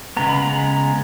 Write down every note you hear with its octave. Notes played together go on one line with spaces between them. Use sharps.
C#3 G#3 B3 A#5
B5
A#5